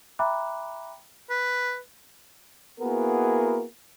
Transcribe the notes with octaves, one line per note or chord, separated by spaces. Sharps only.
E5 G5 A#5 B5 D6 F#6
B4
A#3 B3 E4 F#4 G#4 A#4